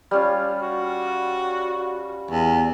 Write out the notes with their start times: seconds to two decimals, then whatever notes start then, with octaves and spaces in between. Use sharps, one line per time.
0.11 G3 C#4 F4
0.62 F#4
2.31 E2